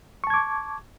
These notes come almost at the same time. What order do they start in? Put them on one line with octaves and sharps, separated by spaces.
C#6 A5 G#6 D6